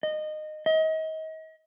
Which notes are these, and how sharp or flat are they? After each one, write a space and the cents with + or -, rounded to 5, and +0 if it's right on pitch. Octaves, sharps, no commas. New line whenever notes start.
D#5 -20
D#5 +35